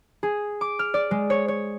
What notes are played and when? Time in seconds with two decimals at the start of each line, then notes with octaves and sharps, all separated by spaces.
0.23 G#4
0.61 D6
0.79 F6
0.94 D5
1.11 G#3
1.30 C#5
1.48 C#5